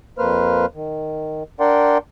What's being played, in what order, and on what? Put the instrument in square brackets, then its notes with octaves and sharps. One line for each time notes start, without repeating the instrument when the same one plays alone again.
[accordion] F2 A#3 B4 C5 F6
D#3
D4 A#4 D5 F#5 G5 C6